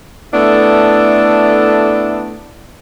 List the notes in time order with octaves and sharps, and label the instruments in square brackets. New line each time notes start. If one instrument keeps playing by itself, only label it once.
[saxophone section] A3 B3 D4 E4 A4